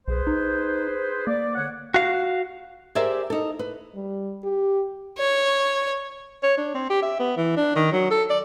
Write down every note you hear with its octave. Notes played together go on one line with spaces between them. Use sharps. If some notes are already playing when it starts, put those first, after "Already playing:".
B1 G#4 B4 C5
D#4
A#3 D5
D3 C#5 F#5
F#4 F5
G4 G#4 A#4 C5 D5 E5
D#4 A4
B4
G3
G4
C#5
C#5
D4
C4
G4
E5
B3
E3
D4
D#3
F#3
A4
D5